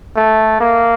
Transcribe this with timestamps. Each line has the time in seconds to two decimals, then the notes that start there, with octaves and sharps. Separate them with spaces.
0.16 A3
0.61 A#3